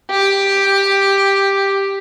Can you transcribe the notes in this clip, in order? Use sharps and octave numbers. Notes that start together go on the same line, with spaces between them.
G4